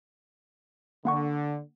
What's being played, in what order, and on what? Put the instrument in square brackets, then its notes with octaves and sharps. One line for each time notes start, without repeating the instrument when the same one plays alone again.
[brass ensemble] D3 [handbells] A#3 F#5 C#6